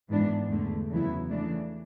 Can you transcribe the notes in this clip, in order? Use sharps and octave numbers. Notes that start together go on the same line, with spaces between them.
G#2 E3 B3 D4
E2 D3 A3
E2 C#3 F#3 B3 E4
C#3 E3 A3 D4